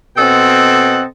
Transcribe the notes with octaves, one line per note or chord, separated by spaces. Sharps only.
B2 C4 A4 D#5 F#5